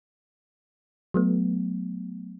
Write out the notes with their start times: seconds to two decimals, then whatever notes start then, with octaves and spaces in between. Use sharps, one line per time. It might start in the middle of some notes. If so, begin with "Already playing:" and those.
1.14 F#3 A3 B3